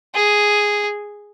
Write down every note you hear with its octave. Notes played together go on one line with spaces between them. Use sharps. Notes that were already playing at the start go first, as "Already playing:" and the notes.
G#4